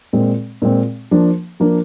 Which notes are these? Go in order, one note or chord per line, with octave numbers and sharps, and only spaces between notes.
A#2 G#3 C4
A#2 G#3 C4
F3 A#3 D4
F3 A#3 D4